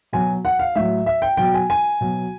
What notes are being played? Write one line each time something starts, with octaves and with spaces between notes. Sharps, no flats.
B2 F#3 G#5
F#5
F5
A2 F#3 E5
E5
G5
B2 F#3 G5
G#5
G#5
B2 F#3